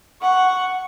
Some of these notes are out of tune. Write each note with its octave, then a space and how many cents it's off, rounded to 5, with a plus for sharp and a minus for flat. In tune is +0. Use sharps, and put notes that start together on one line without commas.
F#5 +0 C#6 +0